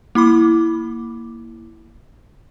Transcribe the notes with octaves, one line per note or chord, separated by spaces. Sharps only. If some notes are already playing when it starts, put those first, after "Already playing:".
A#3 E4 B5 D6